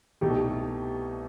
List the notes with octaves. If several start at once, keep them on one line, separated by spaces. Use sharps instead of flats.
C2 B2 A3 D#4 G4